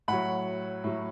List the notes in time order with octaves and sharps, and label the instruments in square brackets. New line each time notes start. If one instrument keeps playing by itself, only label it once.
[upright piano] A2 F#3 F#5 B5
A2 F#3